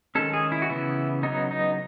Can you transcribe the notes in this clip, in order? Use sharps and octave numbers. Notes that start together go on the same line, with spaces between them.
D#3 G#3 C#4 A4
G#4
E4
F#4
C#3 E3 B3 E4
C#3 F#3 B3 D#4
D#4